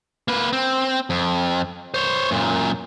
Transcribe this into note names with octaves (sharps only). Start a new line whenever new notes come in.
A#3 B4
C4
F2
C5 C#5
F#2 A#2